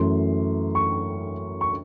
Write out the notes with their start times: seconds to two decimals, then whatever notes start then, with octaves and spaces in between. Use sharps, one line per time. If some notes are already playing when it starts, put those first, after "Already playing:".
Already playing: F#2 E3 A3 C6
0.75 C#6
1.61 C#6